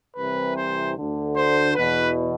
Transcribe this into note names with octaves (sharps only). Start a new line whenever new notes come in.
C2 C3 E3 B4
C5
D2 D3
C5
E2 B2 B4